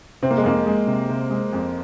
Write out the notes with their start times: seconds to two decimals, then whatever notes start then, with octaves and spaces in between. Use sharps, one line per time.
0.22 C3 C4
0.30 A#3
0.38 G#3
0.43 F2 A#3
0.66 G#3
0.87 C3
1.09 C3
1.30 G#3
1.53 F2